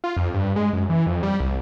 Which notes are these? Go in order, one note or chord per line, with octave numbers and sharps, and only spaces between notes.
F4
F2
G2
G#3
F#2
E3
F2
G3
C2